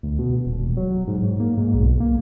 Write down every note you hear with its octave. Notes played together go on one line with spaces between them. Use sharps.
D2
B2
D#1
E1
F#3
G#2
G#2
A#3
G#2
B1
A#3